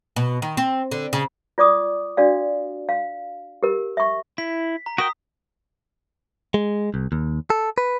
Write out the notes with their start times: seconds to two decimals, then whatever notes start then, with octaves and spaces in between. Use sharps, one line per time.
0.16 B2
0.42 D#3
0.57 C4
0.91 D3
1.13 C#3
1.58 F4 D5 D6 D#6
2.17 D4 F#4 D5 F5
2.89 F5
3.63 G4 A#4
3.97 E5 C#6
4.38 E4 B6
4.86 A#5
4.98 F#4 A#4 G5 D#6 B6
6.54 G#3
6.94 C2
7.12 D#2
7.50 A4
7.78 B4